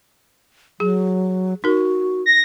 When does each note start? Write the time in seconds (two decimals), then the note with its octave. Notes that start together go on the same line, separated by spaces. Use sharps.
0.80 F#3 G#4
1.64 D#4 F#4 A#4
2.26 A#6